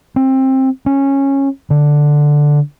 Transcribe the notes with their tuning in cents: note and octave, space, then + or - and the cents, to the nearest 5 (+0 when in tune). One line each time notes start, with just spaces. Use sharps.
C4 +20
C#4 -15
D3 +0